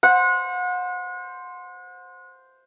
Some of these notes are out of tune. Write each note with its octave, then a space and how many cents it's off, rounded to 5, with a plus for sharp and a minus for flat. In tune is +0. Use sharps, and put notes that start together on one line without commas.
C5 +0 F#5 -35